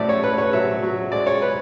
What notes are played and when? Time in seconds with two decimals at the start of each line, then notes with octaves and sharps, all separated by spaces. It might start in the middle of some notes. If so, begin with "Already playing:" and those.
Already playing: A2 F#3 D5 E5
0.09 C#5
0.23 A2 B4
0.38 C#5
0.53 F#3 E5
0.83 F#3
1.12 G#3 D5
1.27 C#5
1.42 B4